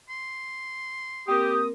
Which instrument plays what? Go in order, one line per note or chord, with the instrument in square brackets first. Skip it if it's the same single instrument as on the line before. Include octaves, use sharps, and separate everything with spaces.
[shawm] C6
[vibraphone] A#3 C4 A#4 [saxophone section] G4 [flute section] D#6